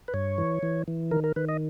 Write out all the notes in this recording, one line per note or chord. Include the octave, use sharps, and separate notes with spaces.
B4
G2 C#5
E3
E3
E3
D#3 A#4
A#4
D#3 B4
D#5